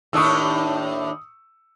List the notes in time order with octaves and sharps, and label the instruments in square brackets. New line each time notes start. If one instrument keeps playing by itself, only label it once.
[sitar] D#2 A2 D4 [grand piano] C#6 D#6 E6